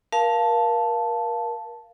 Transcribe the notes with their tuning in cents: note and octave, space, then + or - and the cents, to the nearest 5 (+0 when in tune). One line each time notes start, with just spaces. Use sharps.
A#4 +30 F5 -10 A5 +0